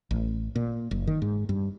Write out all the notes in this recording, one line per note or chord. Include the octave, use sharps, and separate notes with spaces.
A1
A#2
F#1
D#3
G#2
G2